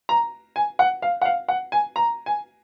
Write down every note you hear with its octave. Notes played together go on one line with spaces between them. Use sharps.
A#5
G#5
F#5
F5
F#5
F5
F#5
G#5
A#5
G#5